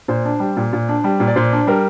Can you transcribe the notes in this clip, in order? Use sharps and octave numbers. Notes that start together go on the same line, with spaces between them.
A#2 C5
D4
G3
A#2
A#2
D4
G3
A#2
D5
A#2 C5
D4
G3 A#4